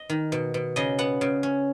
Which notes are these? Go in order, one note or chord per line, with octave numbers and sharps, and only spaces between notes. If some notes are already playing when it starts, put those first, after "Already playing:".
Already playing: D#5
D#3
B2
B2
C#3 D#5
B3 F#5
C#3
C#4